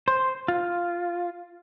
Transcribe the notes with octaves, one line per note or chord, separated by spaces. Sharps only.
C5
F4